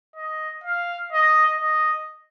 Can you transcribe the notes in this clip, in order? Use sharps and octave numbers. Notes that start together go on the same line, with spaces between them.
D#5
F5
D#5
D#5